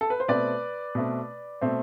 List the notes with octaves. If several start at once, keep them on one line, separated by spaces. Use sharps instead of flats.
A4
B4
C5
B2 A3 C4 B4 D5
B2 A3 C4
B2 A3 C4